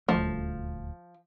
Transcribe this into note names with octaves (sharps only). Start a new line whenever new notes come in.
D#1 D2 F3 A3